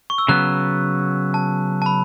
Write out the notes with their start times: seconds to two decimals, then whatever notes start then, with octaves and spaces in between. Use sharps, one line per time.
0.10 C#6
0.18 E6
0.29 C#3 F#3 B3 F#6
1.34 A5
1.82 A5
1.86 B5